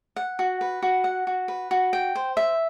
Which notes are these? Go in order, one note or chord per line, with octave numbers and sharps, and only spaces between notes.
F#5
F#4
B4
F#4
F#5
F#4
B4
F#4
G5
C5
E5